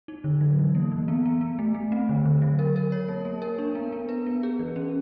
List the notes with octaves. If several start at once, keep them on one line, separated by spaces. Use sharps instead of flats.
D#4
D3
F#3
E3
A#3
E3
B3
B3
B3
A3
A3
C4
D3
D3
F#3
A#4
A#4
C#5
A#3
A#3
A#4
D4
B3
B3
B4
B3
G#4
E3
C#4